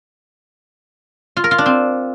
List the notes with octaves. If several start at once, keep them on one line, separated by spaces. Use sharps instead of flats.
F4
A#4
F4
D4
C4